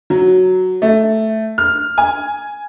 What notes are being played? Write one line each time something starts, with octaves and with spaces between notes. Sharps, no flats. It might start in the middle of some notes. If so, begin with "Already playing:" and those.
F#3
A3
F6
G#5